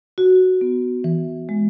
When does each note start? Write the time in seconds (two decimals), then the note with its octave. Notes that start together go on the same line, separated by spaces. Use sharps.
0.18 F#4
0.61 B3
1.04 E3
1.49 G#3